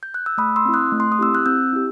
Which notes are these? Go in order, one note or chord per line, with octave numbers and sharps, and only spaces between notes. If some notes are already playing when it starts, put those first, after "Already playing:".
G6
F#6
E6
A3 B5 D#6
C6 E6
C4 E4
D#6 F#6
A3
C6
D#6
C4 E4 G4 E6
F#6
C4 E6 G6
E4 G4